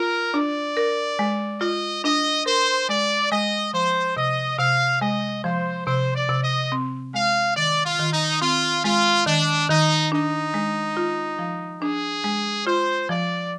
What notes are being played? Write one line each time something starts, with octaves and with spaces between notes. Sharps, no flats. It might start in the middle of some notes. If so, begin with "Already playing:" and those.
Already playing: F4 A#4
D4 D5
A#4
G#3
F4 D#5
D4 D#5
A#4 C5
G#3 D5
G#3 D#5
F3 C5
C3 D#5
C3 F5
G#3 D#5
F3 C5
C3 C5
D5
C3
D#5
C4
G#3 F5
D#3 D5
F4
D#3
D#4
C4 F4
G#3 F4
D#3 D4
D#3 D#4
D4 D#4
G#3
F4
F3
D4 G#4
G#3
F4 C5
F3 D5